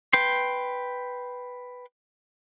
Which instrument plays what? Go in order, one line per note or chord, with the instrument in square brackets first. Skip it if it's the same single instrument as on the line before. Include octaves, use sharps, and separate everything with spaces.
[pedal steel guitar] B4 G5 C6